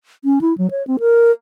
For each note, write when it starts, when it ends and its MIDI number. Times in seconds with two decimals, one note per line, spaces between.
0.25 0.39 61
0.41 0.56 64
0.58 0.71 54
0.71 0.85 73
0.87 0.97 60
1.00 1.31 70